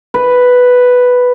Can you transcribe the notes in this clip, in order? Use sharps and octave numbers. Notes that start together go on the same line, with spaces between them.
B4